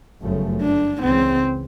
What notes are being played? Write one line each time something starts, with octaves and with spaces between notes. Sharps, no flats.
G1 F#2 C#3 F3 A3
D4
C#2 C#3 E3 C4